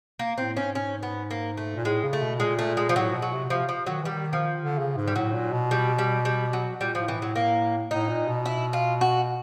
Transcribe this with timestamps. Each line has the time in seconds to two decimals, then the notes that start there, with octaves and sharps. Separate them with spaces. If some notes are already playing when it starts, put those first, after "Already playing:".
0.19 A#3
0.38 A2 C4
0.56 G#2 C#4
0.75 C#4
1.03 B3
1.31 A#3
1.57 A3
1.76 A#2
1.85 A2 G#3
2.04 C#3
2.13 A3
2.22 B2
2.40 A#2 G#3
2.59 A3
2.77 G#3
2.89 F3
2.95 A2 F#3
3.13 B2
3.22 F#3
3.32 C3
3.50 C3 F3
3.69 F3
3.86 D#3 F#3
4.02 E3
4.05 D#3 G3
4.33 F3
4.60 D3
4.79 C#3
4.97 G#2
5.08 G3
5.16 A2 F#3
5.34 A#2
5.53 B2
5.71 G3
5.99 G3
6.25 G3
6.53 F#3
6.80 A#2 G3
6.95 A2 F3
7.08 E3
7.17 A2 F#3
7.36 A#3
7.91 A2 D#4
8.09 A#2
8.28 B2
8.46 E4
8.73 F4
9.01 F#4